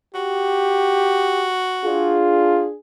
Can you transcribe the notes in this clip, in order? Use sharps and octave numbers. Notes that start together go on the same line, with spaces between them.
F#4 G4
D4 F4 G#4